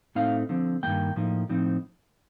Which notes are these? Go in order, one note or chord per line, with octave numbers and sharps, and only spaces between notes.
A2 A3 C4 D#4 F5
D3 F3 C4
G2 D#3 G3 A#3 G5
A2 F3 A#3 D#4
A2 F3 C4 D#4